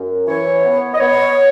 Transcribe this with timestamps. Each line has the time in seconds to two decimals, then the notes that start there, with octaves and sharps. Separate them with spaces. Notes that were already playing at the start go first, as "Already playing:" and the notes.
Already playing: F#2
0.27 E3 C#5
0.64 B3
0.94 D#5
1.00 B3 C#5